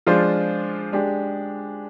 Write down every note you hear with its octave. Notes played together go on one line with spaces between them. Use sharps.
F3 G#3 D4 F4 C5
G#3 D4 G4